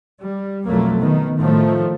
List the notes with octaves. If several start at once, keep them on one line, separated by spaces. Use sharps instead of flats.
G3
B1 F2 F#3 A3 A#3
D#3 B3
A2 D#3 F3 A3